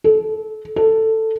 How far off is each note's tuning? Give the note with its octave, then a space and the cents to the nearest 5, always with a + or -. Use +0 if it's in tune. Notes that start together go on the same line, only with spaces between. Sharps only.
A4 -25
A4 +10